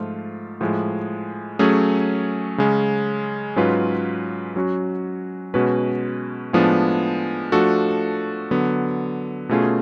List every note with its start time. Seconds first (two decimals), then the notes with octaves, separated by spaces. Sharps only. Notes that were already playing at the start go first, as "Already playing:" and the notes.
Already playing: G#2 F3 A3 F4
0.61 A2 F3 G#3
1.59 F#3 A3 C#4 G#4
2.58 C#3 G#3 C#4
3.56 G#2 F#3 C#4 F4 B4
4.56 F#3 C#4 F#4
5.54 B2 G#3 C#4 F#4 B4
6.53 A2 F3 G#3 B3 D4
7.52 F3 A3 D4 F#4 A4
8.51 D3 F#3 B3
9.49 B2 A3 C#4 F4 G#4